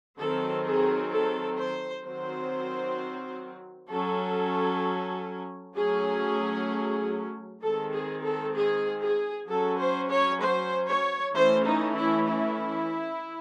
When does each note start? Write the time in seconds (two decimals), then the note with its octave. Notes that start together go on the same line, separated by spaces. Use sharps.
0.18 D#3 F#3 C4 A4
0.65 G#4
1.11 A4
1.57 C5
2.04 D#3 F#3 C4 C5
3.90 F#3 C#4 A4
5.75 F#3 A3 C#4 G#4
7.62 D#3 G#3 C4 A4
7.93 G#4
8.24 A4
8.56 G#4
9.02 G#4
9.48 F#3 C#4 A4
9.78 C5
10.10 C#5
10.41 C5
10.87 C#5
11.34 E3 A3 C#4 C5
11.65 D#4
11.96 E4
12.26 E4